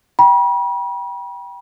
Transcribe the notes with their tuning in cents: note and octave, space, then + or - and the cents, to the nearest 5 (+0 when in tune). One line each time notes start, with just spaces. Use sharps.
G5 +0 B5 -40